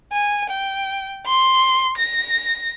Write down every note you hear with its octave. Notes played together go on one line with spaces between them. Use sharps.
G#5
G5
C6
A#6